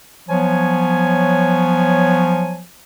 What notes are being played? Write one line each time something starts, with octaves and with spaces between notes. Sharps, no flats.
F3 F#3 B3 C#5 G#5